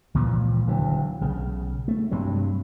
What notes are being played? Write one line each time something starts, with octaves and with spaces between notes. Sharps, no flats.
C#2 A#2 E3 F3
D#1 D3 E3 F#3
B1 C#3
A3
G2 C3 F#3